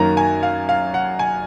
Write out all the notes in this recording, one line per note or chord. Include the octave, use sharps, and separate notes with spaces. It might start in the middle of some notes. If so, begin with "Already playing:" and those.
Already playing: F#2 D#3 F#3 A#3 A#5
G#5
F5
F5
F#5
G#5